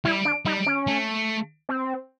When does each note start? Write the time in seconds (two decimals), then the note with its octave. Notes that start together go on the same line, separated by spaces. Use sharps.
0.05 G3 E4
0.25 D4
0.45 G3 D#4
0.66 C#4
0.87 A3
1.69 C4